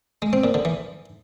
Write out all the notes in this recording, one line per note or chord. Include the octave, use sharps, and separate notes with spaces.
G#3
C4
A#2
D3
E3